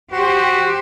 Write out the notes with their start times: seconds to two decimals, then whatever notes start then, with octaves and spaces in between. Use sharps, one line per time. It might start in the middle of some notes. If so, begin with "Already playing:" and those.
0.12 F#4 G4 C5